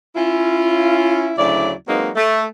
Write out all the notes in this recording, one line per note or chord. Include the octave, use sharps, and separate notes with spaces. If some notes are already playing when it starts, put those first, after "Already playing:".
C#4 E4 F4
D2 C#3 F#3 E4 D5
E3 F#3 G#3 A#3 C4 D#4
A3